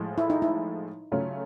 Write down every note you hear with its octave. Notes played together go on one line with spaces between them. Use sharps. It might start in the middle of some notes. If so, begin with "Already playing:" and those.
Already playing: A2 F3 G#3
E4
D#4
E4
C#3 F#3 A3 C#4 F4